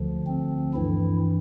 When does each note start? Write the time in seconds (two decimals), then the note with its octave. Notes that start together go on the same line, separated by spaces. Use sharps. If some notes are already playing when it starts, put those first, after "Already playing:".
Already playing: D2 D3 F3
0.27 C4
0.74 G2 E3 E4